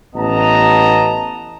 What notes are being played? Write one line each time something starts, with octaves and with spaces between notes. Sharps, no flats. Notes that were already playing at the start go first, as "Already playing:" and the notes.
A1 B3 D#5 A5 A#5